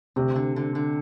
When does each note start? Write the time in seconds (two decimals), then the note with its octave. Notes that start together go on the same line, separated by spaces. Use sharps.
0.16 D2 C3
0.36 D3
0.56 D3
0.75 D3